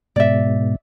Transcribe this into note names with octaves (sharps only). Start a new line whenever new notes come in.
G#2 B2 D5 E5